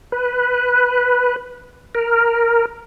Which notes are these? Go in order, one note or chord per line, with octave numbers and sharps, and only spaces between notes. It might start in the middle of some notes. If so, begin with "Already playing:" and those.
B4
A#4